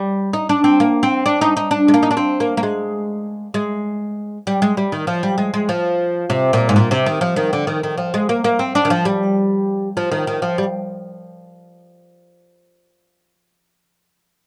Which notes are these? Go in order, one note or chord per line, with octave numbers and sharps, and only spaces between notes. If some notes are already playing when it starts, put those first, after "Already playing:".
Already playing: G3
D#4
D4
C4
A#3
C4
D4
D#4
D#4
D4
G#3
A#3
D#4
D4
C4
A#3
A#3
G#3
G#3
G3
G#3
G3
D#3
F3
G3
G#3
G#3
F3
C3
A#2
G#2
A#2
C3
D#3
F3
D#3
D3
D#3
D#3
F3
G#3
A#3
A#3
C4
D4
D#3
F3
G3
F3
D#3
D#3
F3
G3